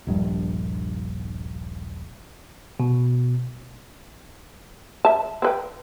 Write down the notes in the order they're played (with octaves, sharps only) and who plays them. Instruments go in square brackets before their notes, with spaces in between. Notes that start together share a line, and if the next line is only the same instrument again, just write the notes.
[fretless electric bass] D#1 A#1 G2
[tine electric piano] B2
[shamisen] E5 A5
C4 B4 G5